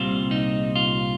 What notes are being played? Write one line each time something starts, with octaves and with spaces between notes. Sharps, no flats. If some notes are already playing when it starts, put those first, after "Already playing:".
Already playing: C2 A#2 G3 C4 F4
D#4
F4